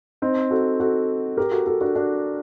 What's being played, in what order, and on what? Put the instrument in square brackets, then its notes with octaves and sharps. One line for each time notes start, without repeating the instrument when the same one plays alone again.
[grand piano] C4 D#4
F#4 A4
F#4 A4
G4 A#4
F#4 A4
F#4 A4
D4 F#4
D4 F#4